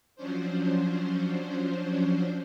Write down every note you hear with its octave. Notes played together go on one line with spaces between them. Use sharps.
F3 F#3 C#4 D4 C5